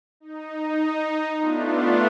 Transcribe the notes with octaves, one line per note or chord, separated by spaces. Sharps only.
D#4
A3 B3 D4 F4